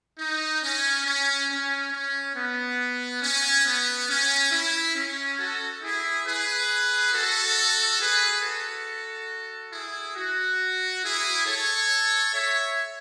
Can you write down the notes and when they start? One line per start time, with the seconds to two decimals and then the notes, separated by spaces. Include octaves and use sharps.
0.18 D#4
0.62 C#4
1.05 C#4
1.49 C#4
1.92 C#4
2.35 B3
3.22 C#4
3.65 B3
4.09 C#4
4.52 E4
4.95 C#4
5.38 F#4 A4
5.82 E4 G#4
6.26 G#4 B4
7.13 F#4 A4
7.99 G#4 B4
8.42 F#4 A4
9.72 E4 G#4
10.16 F#4
11.03 E4 G#4
11.46 A4 C#5
12.33 C#5 E5